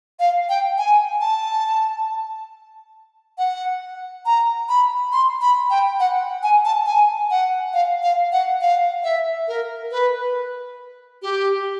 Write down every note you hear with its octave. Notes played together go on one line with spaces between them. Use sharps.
F5
G5
G#5
A5
F#5
A#5
B5
C6
B5
G5
F#5
G#5
A5
G#5
F#5
F5
F5
F#5
F5
E5
A#4
B4
G4